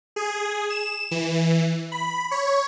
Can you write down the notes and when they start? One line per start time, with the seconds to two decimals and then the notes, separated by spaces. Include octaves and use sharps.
0.16 G#4
0.70 E7
1.11 E3
1.92 B5
2.31 C#5